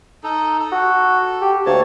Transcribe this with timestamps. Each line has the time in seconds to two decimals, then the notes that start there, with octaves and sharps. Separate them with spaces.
0.23 D#4 A4
0.59 A4
0.72 F#4
1.41 G4
1.66 D2 A#3 C#5 A5